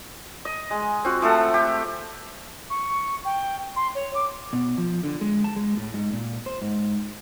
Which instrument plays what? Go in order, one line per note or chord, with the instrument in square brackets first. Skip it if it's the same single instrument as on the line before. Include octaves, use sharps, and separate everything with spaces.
[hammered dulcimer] D#5
G#3
C4 F4 F#4
F3 A3 A4 F#5
G4
[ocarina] C#6
G5
C6
C#5
D6
[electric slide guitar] B2
F3
D3
G#3
A5
G#3
A2
G#2
A#2
C5
G#2